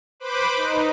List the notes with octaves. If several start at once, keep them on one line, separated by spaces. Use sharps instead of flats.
B4 C5 B5 D6
D#4